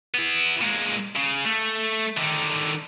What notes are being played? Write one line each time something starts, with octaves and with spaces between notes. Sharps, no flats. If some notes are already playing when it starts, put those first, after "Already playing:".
B3 E4
A#2 G#3
C#3
A3
D3 D#3